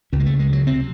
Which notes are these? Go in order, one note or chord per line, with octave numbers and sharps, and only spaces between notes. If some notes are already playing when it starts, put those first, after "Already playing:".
C#2 C#3 C#4
G#3
A3
G#3
F#3
C3 C4